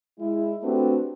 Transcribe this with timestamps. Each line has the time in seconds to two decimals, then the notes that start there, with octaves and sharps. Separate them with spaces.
0.19 G#3 E4
0.63 A3 C4 D4 F#4 G4 B4